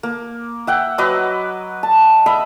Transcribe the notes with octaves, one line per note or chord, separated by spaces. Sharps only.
A#3
E5 F#5 G5
F#3 B4 D#5 D6
A5
D#5 E5 B5